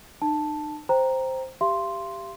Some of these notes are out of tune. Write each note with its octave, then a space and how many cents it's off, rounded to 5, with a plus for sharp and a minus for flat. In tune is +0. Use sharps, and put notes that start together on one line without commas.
D#4 -40 A5 +0
C5 +0 G5 +0 A#5 +0
G4 +0 F5 -45 C6 +0